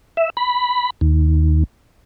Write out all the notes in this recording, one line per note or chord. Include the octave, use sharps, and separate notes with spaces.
E5
B5
D#2